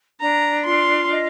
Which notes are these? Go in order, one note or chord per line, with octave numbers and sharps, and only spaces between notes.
D4 A#5
F4 C6
D#5